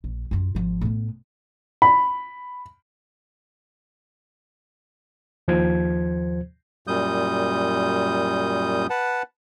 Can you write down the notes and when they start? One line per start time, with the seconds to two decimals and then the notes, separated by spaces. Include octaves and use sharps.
0.04 A#1
0.31 F#2 F4
0.55 G#1 F3
0.81 A2 B3
1.82 B5
5.48 D#2 F3 C5 G#6
6.87 F#2 A#2 G3 D#6 G6
8.90 B4 F#5 A5